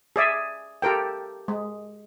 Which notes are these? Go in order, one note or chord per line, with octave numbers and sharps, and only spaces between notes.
G#4 D5 E5
G4 A4 A#4 G5
G#3